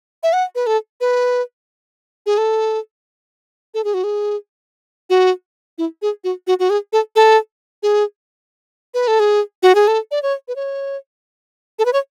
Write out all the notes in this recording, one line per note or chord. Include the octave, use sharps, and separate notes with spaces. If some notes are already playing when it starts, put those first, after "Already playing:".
E5
F#5
B4
A4
B4
G#4
A4
A4
G#4
F#4
G#4
F#4
E4
G#4
F#4
F#4
F#4
G#4
A4
A4
G#4
B4
A4
G#4
F#4
G#4
A4
D5
C#5
B4
C#5
A4
B4
C#5